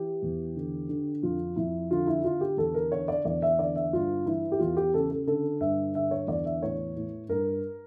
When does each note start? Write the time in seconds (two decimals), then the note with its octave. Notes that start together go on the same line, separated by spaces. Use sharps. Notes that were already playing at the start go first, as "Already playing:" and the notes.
Already playing: E3 G4
0.23 E2
0.56 D3
0.89 D3
1.23 F2 F4
1.56 F2 E4
1.90 D3 F4
2.07 E4
2.24 D3 F4
2.41 G4
2.57 E2 A4
2.74 A#4
2.92 D3 C#5
3.08 D5
3.25 E2 D5
3.42 E5
3.58 D3 D5
3.76 E5
3.93 G2 F4
4.26 E3 E4
4.52 G4
4.59 E2 F4
4.77 G4
4.94 C#3 A4
5.10 A4
5.27 D3 A4
5.60 G2 E5
5.95 D3 E5
6.11 C#5
6.28 E2 D5
6.45 E5
6.62 A2 C#5
6.96 A2
7.29 G2 A#4